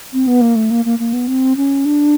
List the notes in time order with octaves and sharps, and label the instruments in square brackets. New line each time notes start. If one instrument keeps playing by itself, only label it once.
[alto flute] C4
B3
A#3
A3
A#3
A#3
A#3
B3
C4
C#4
D4